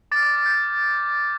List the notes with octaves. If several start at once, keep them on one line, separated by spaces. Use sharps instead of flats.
D6 F6 A6
G6